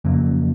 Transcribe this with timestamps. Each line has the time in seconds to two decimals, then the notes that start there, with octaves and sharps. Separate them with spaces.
0.05 F2 C#3 F#3 A#3